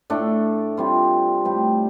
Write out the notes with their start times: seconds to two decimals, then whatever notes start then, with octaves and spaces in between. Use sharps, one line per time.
0.10 A2 A3 D4
0.77 C3 G3 C4 F4
1.45 A2 G3 C4 G4